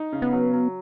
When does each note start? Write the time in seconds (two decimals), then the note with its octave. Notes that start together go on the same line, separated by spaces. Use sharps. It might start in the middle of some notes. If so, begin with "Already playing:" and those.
Already playing: D#4
0.12 C#3
0.22 B3
0.32 F#3
0.53 F#3